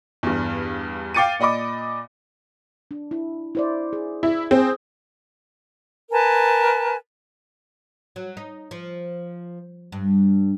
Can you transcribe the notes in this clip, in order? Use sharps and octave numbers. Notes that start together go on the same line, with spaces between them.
E2 G2
F5 G5 D6 A6 C#7 D#7
A#2 D5 D#5 B5 D6
D4
E4
E4 C5 D5
G#4
E4
C4 G#4
A#4 B4 G#5 A5
F#3
D#4
F3
G2